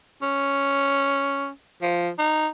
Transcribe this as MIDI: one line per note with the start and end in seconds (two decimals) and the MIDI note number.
0.22 1.49 61
1.82 2.10 53
2.18 2.47 63